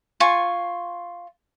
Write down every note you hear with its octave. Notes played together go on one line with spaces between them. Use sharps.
F4 G#5 C#6